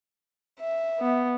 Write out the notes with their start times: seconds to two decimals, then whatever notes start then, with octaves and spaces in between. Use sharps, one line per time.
0.58 E5
1.00 B3